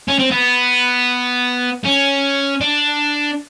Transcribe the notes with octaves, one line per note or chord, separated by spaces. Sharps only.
C#4
C4
B3
C#4
D4